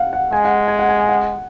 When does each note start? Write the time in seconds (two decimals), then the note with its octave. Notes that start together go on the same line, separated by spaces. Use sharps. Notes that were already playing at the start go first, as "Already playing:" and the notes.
Already playing: F5 F#5
0.13 F#5
0.32 G#3 G#5
0.45 F#5
0.68 G#5
0.79 F#5
0.89 G#5
1.09 F#5